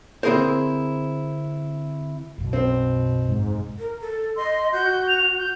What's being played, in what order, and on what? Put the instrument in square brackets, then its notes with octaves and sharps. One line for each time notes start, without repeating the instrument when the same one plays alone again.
[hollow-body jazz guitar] D3 C4 E4 G#4 A#4 C5
[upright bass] B1 F#2 [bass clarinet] B2
[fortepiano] C4
[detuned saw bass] G#2
[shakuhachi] A#4
A4
[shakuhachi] D#5 [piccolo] C6
[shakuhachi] F#4 [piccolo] G6
[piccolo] F7
G6